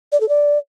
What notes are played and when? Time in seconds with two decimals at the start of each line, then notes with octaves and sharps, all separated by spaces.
0.12 D5
0.20 A4
0.29 D5